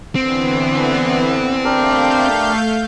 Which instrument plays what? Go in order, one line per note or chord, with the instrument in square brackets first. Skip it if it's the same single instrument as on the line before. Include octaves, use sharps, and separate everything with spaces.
[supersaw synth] D3 E3 B3 [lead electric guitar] C4
[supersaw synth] A3 F5 G6 [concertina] D4 G4 A#4